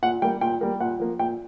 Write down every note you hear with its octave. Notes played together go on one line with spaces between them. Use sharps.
A#2 F#5
G3 A#3 G5
A#2 G5
G3 A#3
A#2 F#5
F3 A#3
A#2 G5